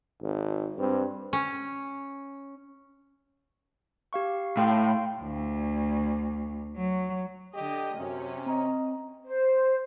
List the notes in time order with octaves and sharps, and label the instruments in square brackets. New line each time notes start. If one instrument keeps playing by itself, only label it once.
[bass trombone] G#1
[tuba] G2 [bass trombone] C4
[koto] C#4
[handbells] G4 F5 C#6
[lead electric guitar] A2 [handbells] F5 G5 C6
[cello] D2
F#3
[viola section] D3 D#5 [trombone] G4
[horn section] F#2 [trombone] C3 [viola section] C#4
[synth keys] C4 [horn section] D#5 A#5
[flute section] C5